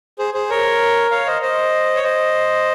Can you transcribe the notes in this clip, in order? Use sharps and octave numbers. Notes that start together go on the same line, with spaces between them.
G#4 C5
G#4 C5
A#4 C#5
C#5 F5
C5 D#5
C5 D#5
C#5
C5 D#5